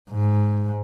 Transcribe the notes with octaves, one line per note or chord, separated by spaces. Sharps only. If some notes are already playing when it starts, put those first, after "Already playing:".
G#2